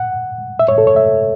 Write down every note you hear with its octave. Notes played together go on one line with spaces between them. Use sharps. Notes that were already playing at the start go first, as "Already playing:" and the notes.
Already playing: F#5
E5
C#5
A4
C#5
E5